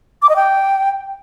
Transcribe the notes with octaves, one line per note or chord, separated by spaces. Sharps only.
D6
D#5
G5